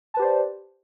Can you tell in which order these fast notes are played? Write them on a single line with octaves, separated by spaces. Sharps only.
A5 B4 G4 C5 D5